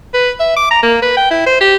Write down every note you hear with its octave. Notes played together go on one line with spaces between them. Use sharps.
B4
E5
D6
A#5
A#3
B4
G5
E4
C5
G4